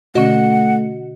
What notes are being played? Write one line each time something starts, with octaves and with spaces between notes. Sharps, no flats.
B2 D3 A3 C#4 F#4 D#5 F#5